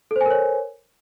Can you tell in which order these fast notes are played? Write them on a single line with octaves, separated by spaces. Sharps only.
A4 C5 G#5 A#4 C#5